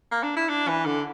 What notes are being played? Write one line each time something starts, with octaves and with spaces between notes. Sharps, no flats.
A#3
D4
E4
D4
E3
D3